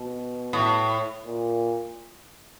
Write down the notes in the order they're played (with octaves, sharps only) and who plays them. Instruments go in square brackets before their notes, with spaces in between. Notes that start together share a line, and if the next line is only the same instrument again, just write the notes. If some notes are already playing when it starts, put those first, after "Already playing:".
Already playing: [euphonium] B2
[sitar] A2
[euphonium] A#2